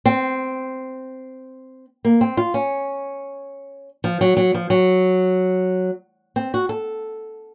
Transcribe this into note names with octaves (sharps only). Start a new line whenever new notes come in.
C4
A#3
C4
F4
C#4
F3
F#3
F#3
F3
F#3
C4
F#4
A4